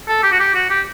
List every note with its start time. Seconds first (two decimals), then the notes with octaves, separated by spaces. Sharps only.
0.08 A4
0.23 G4
0.32 F#4
0.40 G4
0.54 F#4
0.70 G4